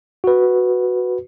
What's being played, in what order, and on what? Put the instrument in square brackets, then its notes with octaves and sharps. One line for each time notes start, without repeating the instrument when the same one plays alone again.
[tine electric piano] F#4 B4